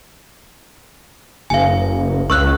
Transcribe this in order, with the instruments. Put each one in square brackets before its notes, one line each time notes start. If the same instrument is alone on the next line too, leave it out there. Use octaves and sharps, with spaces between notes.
[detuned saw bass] F#1 [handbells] F5 G#5
[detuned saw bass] C#2 [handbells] C#6 E6 F#6